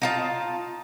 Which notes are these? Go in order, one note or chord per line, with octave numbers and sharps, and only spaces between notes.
D#4 F4 A5